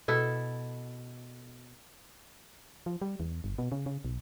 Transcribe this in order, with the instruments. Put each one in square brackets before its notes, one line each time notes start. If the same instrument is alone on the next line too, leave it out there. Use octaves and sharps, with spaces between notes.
[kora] B2 E4 A4
[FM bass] F3
G3
E2
G1
B2
C#3
C#3
B1